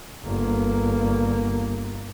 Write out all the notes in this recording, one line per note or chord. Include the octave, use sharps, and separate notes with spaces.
G1 A#3